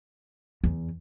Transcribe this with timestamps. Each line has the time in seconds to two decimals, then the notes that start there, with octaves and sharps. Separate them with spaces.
0.64 E2